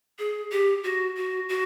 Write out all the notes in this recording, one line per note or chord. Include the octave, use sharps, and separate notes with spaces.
G#4
G4
F#4
F#4
F#4